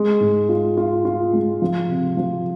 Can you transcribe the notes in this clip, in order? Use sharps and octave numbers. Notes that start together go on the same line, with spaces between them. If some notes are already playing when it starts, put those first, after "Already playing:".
Already playing: G#3
G#2
F4
F4
F4
G#3
F3
C3
F3